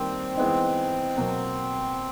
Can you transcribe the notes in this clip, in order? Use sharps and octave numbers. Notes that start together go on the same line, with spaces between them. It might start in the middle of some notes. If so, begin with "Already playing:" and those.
Already playing: D#3 G3 A#3 C4 D4
E3 G#3 B3 D#4
B2 F#3 A#3